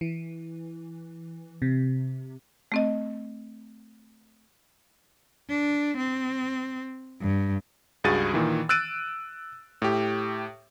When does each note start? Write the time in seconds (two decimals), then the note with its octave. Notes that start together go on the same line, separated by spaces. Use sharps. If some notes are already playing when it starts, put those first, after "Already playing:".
0.01 E3
1.62 C3
2.72 A3 C4 D#5
5.50 D4
5.97 C4
7.21 G2
8.04 C#2 G2 F#4 G#4 A6 D#7
8.34 A#2 D#3 E3
8.69 E6 F#6 A6 D7 D#7
9.82 A2 G4